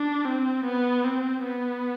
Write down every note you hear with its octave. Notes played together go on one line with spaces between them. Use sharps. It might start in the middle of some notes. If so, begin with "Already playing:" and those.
Already playing: D4
C4
B3
C4
B3